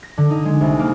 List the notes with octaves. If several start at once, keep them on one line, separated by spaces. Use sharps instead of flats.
A#6
D3
D#4
G#3
C2
A#3